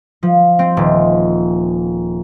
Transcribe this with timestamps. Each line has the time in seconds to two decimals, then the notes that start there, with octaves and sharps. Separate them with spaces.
0.23 F3
0.59 C4
0.77 D#1